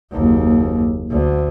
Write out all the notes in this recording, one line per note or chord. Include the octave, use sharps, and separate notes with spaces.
F#1 D#2
D2